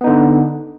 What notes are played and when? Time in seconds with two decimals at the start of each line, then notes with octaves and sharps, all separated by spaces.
0.01 B3
0.04 D#4
0.07 D3